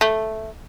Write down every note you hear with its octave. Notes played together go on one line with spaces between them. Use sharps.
A3